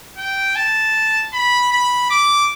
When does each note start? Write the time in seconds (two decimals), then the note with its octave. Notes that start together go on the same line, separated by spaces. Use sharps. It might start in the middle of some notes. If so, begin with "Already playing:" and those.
0.18 G5
0.56 A5
1.33 B5
1.72 B5
2.11 D6